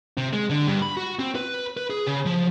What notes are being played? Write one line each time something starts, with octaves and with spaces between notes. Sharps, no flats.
C3
G#3
D3
G2
B5
F#4
C4
B4
B4
G#4
C#3
F3